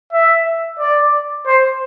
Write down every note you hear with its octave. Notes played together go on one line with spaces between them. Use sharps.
E5
D5
C5